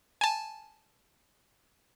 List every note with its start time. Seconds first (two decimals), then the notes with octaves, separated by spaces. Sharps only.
0.21 G#5 A5